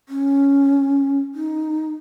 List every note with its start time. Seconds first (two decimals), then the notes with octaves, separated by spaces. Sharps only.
0.09 C#4
1.35 D#4